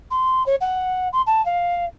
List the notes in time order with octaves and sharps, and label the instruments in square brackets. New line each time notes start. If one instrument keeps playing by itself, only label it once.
[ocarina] C6
C#5
F#5
C6
A5
F5